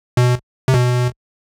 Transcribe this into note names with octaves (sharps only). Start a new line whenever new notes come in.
B2
C3
B2